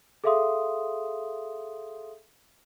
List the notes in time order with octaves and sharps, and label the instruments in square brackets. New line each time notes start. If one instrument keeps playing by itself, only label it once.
[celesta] G#4 A4 E5 F5 C6 D#6